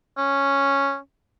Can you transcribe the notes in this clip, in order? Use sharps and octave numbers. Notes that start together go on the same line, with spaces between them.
C#4